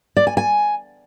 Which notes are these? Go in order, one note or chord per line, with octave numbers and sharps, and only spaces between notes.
D5
G#5
G#5